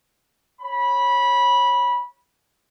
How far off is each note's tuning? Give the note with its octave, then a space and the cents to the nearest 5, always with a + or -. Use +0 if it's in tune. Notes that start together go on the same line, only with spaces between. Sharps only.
C#5 -20 B5 -15